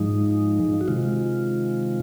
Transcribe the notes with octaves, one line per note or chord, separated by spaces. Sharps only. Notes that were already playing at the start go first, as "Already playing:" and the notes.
Already playing: G#2 F3 G#3 D#4
F#4
C3 D#3 G#3 F4